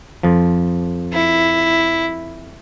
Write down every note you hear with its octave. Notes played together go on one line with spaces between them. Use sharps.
F2 F3
E4